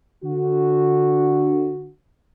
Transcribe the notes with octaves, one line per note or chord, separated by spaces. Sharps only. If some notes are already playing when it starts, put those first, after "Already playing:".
D3 F#4